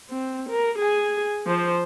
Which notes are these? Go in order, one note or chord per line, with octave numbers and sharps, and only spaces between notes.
C4
A#4
G#4 G#5
F3 C5